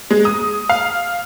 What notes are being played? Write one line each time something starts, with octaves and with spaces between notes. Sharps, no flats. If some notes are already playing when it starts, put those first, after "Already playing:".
G#3
D#6
F5